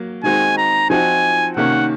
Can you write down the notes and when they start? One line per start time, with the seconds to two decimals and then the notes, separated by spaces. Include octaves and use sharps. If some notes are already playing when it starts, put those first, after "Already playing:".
Already playing: F#3 A#3
0.24 D#3 G#3 C4 D#4 F#4 G#5
0.58 A#5
0.90 F3 C4 D#4 F#4 G#5
1.57 C3 D#3 A#3 C#4 F#5